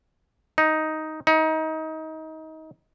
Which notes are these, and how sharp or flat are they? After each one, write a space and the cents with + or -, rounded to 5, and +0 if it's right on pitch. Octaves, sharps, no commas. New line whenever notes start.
D#4 +5
D#4 +25